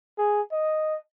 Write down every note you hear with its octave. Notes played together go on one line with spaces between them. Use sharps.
G#4
D#5